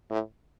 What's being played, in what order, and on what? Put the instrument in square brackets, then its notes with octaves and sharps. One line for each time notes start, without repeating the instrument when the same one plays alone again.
[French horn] A2